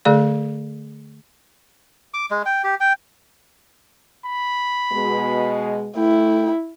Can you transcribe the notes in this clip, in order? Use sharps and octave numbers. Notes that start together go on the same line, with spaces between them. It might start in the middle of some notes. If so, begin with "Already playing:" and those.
D3 A3 G#4 D5
D6
G#3
G5
G4
G5
B5
B2 G#3
A3 E4 G5